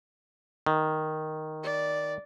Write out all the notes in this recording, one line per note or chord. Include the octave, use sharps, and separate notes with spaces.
D#3
D5